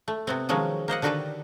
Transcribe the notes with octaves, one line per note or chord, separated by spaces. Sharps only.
A3
C3 B3 C4
D#3 F3 F#3 G#3 C#4
A#3 C5 D#5 F#5
D3 D#3 F#4 G4 A4 B4